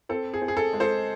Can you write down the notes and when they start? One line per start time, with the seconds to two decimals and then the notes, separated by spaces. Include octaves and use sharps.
0.09 C4 A4
0.34 G#4
0.42 C4
0.48 G#4
0.57 A4
0.73 G#3
0.80 A4 C5